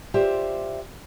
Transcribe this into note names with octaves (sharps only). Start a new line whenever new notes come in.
F4 G4 C5 D5 E5